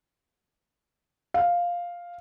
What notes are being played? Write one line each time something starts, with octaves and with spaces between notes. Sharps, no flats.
F5